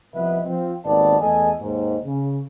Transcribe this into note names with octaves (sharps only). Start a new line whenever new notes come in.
C2 F3 B3 B4 D#5 E5
F3 C4 F4
G#1 D#2 A#3 B3 D5 A5
E2 A3 G#4 A4 D#5 G#5
D#2 G#2
C#3